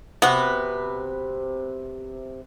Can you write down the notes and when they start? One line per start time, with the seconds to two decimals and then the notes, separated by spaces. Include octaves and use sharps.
0.22 C3 B3 F#4 B4